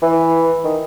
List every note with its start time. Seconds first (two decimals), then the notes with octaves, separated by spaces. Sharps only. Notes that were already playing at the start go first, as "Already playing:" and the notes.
0.02 E3
0.64 D#3